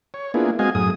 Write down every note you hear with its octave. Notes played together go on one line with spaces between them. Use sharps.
C#5
A#3 B3 D4 E4 F4 G#4
G#3 C4 F#4 D#5 F5 G#5
F#2 A2 G#4 D#6